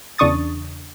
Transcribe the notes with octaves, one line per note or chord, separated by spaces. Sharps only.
E2 C#3 D4 C#6 D#6 A6